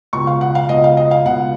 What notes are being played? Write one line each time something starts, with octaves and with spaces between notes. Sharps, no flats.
C#2 B2 C#6
F5
F#5
F5
C#2 B2 D#5
F5
D#5
F5
C#2 B2 F#5